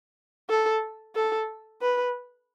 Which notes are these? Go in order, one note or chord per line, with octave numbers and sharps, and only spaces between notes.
A4
A4
B4